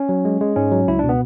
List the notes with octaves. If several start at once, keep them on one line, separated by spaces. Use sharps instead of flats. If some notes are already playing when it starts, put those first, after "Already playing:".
Already playing: C#4
F#3
G#3
G#3
G#2 C#4
F#3
C#2 E4
B2 D4
B3